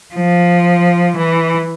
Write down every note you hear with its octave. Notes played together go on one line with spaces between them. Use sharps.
F3
E3